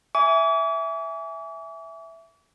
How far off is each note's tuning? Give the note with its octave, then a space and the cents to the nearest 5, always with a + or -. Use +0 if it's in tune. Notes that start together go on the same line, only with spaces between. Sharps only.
E5 +0 G#5 +0 D6 -45